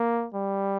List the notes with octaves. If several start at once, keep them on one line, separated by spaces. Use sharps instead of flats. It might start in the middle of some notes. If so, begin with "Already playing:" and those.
Already playing: A#3
G3